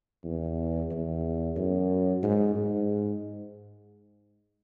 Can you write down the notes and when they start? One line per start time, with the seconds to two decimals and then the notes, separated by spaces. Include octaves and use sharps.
0.24 E2
0.91 E2
1.56 F#2
2.23 G#2
2.55 G#2